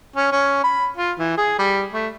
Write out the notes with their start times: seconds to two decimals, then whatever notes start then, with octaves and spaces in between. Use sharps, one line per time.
0.16 C#4
0.32 C#4
0.64 B5
0.97 F4
1.19 E3
1.38 G#4
1.59 G3
1.93 A3